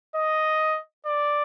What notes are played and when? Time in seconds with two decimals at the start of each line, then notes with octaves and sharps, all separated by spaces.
0.15 D#5
1.06 D5